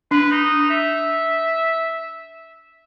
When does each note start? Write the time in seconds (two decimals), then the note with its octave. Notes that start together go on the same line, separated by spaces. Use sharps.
0.11 D4 B4
0.31 D#4
0.70 E5